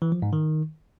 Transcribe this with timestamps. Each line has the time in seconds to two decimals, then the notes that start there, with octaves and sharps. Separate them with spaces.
0.02 E3
0.12 F3
0.22 G#2
0.33 D#3